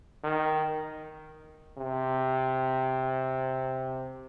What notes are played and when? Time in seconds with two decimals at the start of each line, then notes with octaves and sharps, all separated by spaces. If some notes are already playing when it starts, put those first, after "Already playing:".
0.24 D#3
1.78 C3